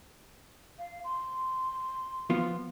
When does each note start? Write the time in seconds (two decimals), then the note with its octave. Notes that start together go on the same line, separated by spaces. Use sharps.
0.79 F5
1.04 C6
2.30 F3 B3 F4